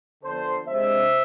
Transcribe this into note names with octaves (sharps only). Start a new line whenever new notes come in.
D3 F3 B3 A4 C5
C3 G#3 D4 C5 E5